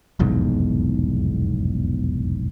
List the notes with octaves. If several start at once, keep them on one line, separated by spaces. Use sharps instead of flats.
F1 B1 E2 G#2